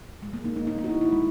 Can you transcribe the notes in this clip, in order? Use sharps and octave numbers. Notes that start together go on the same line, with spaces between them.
G#3
A#3
D#4
D#4
D#4
D#4
F#4
E4
E4
G#3